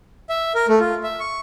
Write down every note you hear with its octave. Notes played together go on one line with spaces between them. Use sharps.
E5
A#4
A3
F4
E5
C#6